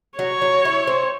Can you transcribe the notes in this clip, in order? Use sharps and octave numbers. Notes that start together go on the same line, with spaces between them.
F#3 C#5
F#3
E4
C4